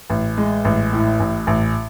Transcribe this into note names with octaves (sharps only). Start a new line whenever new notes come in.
A1
G#3
A1
A2
A1
A1